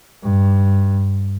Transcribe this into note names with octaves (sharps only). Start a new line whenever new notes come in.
G2